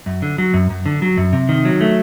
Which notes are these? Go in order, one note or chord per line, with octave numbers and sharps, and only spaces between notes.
F#2
D3
F#3
F#2
F#2
D3
F#3
F#2
C3
D#3
F#3
A3